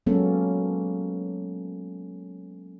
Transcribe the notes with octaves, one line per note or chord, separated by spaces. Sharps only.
F#3 G#3 A#3 B3 C#4 A4